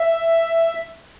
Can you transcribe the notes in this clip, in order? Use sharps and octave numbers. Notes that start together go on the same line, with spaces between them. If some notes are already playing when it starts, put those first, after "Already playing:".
Already playing: E5